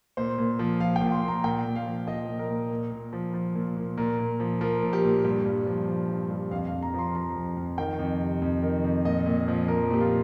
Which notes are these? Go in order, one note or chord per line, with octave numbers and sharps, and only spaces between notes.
A#2 C5
A#2
F3
F3 F5
G5
A#2
C6
A#2
A#5
A#2 G5
A#2
F5
F3
F3 D#5
A#2
A#4
A#2
A#2
A#2
F3
F3
A#2
A#2
A#2 A#4
A#2
F3
F3 A#4
A#2
G4
A#2
G2 G4
G2
F3
F3
G2
G2
F2 F5
F5
F2
A#5
F3 C6
F3 A#5
F2
F2
D#3 G5
F2
C3
F2
D#3
F2
A#2 D#5
A#2
F3
F3 A#4
A#2 G4
F4